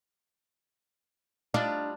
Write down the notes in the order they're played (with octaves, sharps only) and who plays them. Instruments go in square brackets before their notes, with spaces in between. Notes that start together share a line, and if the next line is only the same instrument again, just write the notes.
[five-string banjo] G3 D#4 F4 [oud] D4